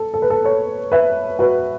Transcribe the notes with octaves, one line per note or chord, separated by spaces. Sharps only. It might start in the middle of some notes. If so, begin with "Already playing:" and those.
Already playing: A4
A4
B4
A4
A4 C#5
B4 E5
F#4 B4